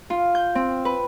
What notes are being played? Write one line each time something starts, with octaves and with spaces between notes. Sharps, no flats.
F4
G6
C4
B4